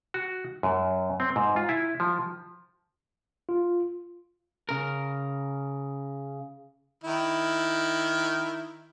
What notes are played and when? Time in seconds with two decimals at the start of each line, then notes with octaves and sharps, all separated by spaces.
0.14 F#4
0.63 F#2
1.20 C4
1.36 G#2
1.56 F4
1.69 E4
2.00 F3
3.49 F4
4.69 C#3 A#4
7.04 D#3 E4